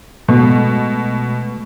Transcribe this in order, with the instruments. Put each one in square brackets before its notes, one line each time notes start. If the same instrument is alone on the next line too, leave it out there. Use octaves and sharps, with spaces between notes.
[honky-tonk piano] B2 [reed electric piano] G#3 A3